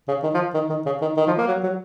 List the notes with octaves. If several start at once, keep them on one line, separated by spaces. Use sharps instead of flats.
C#3
D#3
F3
D#3
D#3
C#3
D#3
D#3
F3
A#3
F#3
F#3